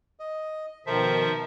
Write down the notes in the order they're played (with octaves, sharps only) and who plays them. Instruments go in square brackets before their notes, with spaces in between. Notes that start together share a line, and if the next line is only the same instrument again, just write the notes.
[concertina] D#5
[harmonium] B2 D#3 [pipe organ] F3 E5 [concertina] A4 A#4 C5